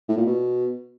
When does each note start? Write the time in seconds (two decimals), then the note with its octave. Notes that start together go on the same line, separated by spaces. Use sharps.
0.09 A2
0.17 A#2
0.26 B2